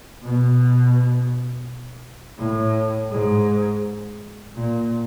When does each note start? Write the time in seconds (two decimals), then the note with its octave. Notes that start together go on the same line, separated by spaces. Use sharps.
0.23 B2
2.39 A2
3.11 G#2
4.56 A#2